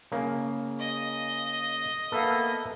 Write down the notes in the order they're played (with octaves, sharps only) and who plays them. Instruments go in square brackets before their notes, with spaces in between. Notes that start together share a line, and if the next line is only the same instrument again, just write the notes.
[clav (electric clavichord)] C#3 A#3
[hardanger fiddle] D#5
[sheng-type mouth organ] A#3 B3 B4 [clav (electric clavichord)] A4 E5 F5